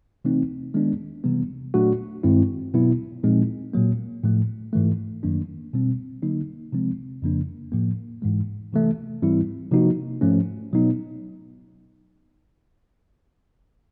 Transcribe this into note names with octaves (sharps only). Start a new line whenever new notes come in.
C3 E3 A3 C4 D#4
D#3 G#3 B3 D4
C3 E3 G3 B3
A#2 F#3 A3 D4 F#4
G2 D#3 G#3 C4 E4
B2 F#3 B3 E4
A#2 F3 G#3 C4 D#4
A#2 F#3 A#3
A2 F3 A3
G#2 E3 A3
F#2 D#3 F#3 A#3 D4
B2 G3 C4
D3 F#3 A#3 D#4
C3 F3 G#3 C4
F2 C#3 F3 A#3 D4
A2 F3 A#3
G#2 E3 G#3
C3 E3 A3
G#2 E3 G3 C4 E4
C3 F3 A#3 D#4 F#4
G#2 F3 A3 C#4
B2 F#3 B3 D#4